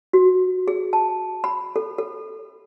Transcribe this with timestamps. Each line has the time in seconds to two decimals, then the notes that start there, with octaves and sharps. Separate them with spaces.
0.13 F#4
0.68 G#4
0.93 A5
1.44 B5
1.76 A4
1.98 A4